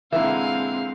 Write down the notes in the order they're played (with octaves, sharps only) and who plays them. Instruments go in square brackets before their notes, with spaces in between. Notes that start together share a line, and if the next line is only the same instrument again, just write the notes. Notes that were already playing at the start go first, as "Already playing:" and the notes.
[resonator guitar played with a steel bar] A#2 E5 [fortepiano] D3 E3 [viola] G#3 C4 [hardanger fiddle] F5